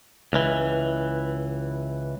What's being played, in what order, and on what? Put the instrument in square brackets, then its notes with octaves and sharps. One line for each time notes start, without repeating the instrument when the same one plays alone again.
[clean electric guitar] C#2 E3